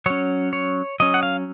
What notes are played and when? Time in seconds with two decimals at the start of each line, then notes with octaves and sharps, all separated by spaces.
0.06 F#3 C#4 C#5
0.53 C#5
1.00 F#3 C#4 D#5
1.14 F#5
1.23 F5